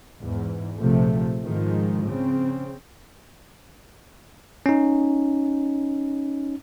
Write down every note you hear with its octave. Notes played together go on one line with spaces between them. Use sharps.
E2 G#2
A#1 C3 F3 A3
G#2 D#3 F3 G#3
C#3 C4
C#4 D#4